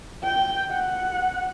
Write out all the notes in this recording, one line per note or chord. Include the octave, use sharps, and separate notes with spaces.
G5
F#5